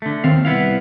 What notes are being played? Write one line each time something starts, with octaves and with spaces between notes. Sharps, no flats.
D3 A3
D#2 D#3 C4 F5
C2 B3 E4 F5